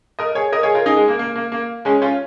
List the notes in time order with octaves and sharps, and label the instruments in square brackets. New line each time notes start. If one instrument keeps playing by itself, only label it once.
[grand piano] A#4 D#5
G#4 C#5
A#4 D#5
G#4 C#5
F4 A#4
D#4 G#4
G#3
A#3
A#3
A#3
A#3
G#3 C#4
C#4 F4